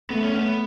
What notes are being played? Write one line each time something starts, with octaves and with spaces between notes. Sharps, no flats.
A3 B3
C#4
B3